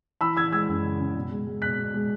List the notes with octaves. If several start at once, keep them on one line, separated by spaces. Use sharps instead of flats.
E3 B5 E6
E3 E6 G#6
G#3 E6 G#6
F#2
C#3
C#3
B2
G#3
G#3
B2 F#6 B6
B2
G#3